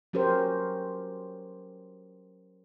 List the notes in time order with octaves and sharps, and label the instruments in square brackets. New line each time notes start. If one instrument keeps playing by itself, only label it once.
[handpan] F#3 C#4 G4 A#4 C5